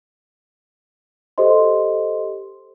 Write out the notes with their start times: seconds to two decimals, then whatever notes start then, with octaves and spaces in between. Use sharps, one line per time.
1.38 G4 A4 C5 D#5 C6